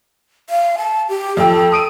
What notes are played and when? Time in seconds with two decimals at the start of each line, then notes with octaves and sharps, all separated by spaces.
0.50 F5
0.78 A5
1.09 G4
1.37 F2 A4 G5
1.72 D#6 D7 D#7